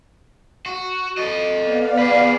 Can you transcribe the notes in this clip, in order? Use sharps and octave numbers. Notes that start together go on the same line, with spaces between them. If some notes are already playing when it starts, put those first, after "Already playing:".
F#4
A4 D#5
B3 D5 F5
G#4 B4